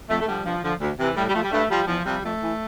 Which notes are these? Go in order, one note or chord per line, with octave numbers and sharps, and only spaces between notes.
F2 A3
A3
D3 F3 G3
G2 F3
D3 F3
D2
C3 E3
A2 G3
G3
F3 A3
G3
G2 A3
F3 G3
E2 F3
C3 F3 G3
F2 A3
E3